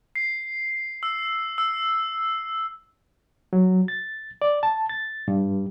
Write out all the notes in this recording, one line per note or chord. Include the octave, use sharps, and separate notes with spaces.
C7
E6
E6
F#3
A6
D5
A5
A6
G2